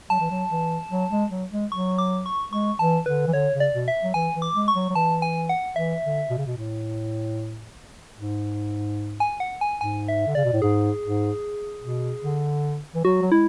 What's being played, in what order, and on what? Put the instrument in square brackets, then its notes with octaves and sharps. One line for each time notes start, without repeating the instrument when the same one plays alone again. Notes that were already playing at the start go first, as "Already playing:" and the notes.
[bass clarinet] F#3 [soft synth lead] A5
[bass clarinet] E3
F#3
E3
F#3
G#3
F#3
G#3
[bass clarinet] F#3 [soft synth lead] C#6
[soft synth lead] D6
C#6
[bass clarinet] G#3 [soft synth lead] C#6
[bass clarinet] E3 [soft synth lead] A5
[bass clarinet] D3 [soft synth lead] B4
[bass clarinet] E3
[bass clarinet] D3 [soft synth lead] C#5
[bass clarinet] C#3
[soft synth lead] D5
[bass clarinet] B2
[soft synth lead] E5
[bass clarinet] F#3
[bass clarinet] E3 [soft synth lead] G#5
[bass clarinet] E3
[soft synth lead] D6
[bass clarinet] G#3
[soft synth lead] C#6
[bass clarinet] F#3
F#3
[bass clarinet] E3 [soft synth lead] A5
[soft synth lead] G#5
F#5
[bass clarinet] E3 [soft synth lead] E5
[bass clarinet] D3
B2
C#3
B2
A2
G#2
[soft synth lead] G#5
F#5
G#5
[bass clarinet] G#2 [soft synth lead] G#5
[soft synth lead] E5
[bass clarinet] D3
[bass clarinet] C#3 [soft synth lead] D5
[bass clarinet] B2
A2
[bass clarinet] G#2 [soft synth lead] G#4
[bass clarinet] G#2
B2
D3
E3
[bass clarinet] F#3 [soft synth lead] F#4
[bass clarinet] F#3
[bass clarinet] G#3 [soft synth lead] E4